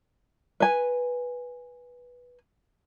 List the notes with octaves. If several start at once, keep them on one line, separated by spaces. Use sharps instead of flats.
B4 G#5